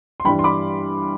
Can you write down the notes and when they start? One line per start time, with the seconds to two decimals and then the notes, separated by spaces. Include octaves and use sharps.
0.20 C6
0.25 G2 E3 G3 D4 G5 B5
0.39 C6
0.44 B5 D6